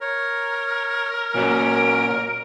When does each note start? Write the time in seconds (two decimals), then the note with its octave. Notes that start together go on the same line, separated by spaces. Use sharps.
0.01 A#4 C#5
1.34 A#2 F#3 A#3 C#4 F#4 D7